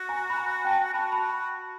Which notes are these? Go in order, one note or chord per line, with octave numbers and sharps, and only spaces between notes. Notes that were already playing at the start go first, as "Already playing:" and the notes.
Already playing: F#4
G#5 A#5
B5
G#5 A#5
G5 A5
F#4 A5 B5
A5 B5